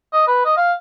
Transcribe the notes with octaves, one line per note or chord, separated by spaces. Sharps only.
D#5
B4
D#5
F5